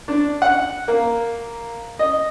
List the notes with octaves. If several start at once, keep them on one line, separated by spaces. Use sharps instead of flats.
D4
F#5
A#3
D#5